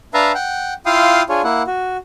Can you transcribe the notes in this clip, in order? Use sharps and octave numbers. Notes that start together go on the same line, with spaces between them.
D4 B4 E5 F5 A5 A#5
F#5 G5
E4 F4 F5 G5 C6 D#6
D4 F4 G#4 C#5
A#3 E4 F#5
F#4